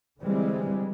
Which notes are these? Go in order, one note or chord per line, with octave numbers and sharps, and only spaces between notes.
D3 E3 G3 G#3 C4